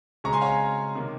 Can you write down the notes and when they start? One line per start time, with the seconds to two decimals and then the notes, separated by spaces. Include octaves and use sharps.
0.24 C#3 G#3 C4 A#5 C#6
0.33 G#5 C6
0.41 C#5 F5
0.95 C3 D#3 A#3